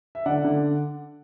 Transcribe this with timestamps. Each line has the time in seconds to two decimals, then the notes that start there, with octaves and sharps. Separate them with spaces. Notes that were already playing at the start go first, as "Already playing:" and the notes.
0.15 E5
0.26 D3 D5 F#5
0.44 D3